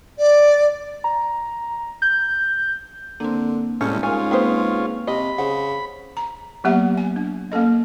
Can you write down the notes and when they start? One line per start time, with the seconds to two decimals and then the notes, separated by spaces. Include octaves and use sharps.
0.18 D5
1.04 A#5
2.02 G6
3.20 D3 A#3 C4
3.81 C2 A2 G#3 C#4 F6 G6
4.03 G#2 C#4 F4 A#4 G#5
4.31 A#3 C4 G4 G#4 B4 C5
5.07 C3 D#5 B5
5.38 C#3 C5 F#5
6.17 A#5
6.64 F#3 A#3 B3 G4 E5 F#5
6.97 G#5
7.16 D4
7.52 A#3 C#4 A4 D#5